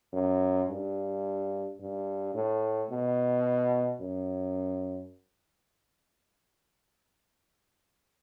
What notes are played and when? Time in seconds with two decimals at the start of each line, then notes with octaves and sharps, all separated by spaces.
0.13 F#2
0.69 G2
1.80 G2
2.34 A2
2.91 B2
4.01 F#2